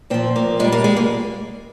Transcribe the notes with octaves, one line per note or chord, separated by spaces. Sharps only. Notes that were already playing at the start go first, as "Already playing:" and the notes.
A#2 F3 C4
A#3
A#2 G#3
G3
A#3
G#3
A#3